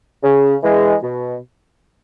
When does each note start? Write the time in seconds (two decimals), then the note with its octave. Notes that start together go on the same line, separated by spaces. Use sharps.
0.23 C#3
0.63 E3 G#3
1.03 B2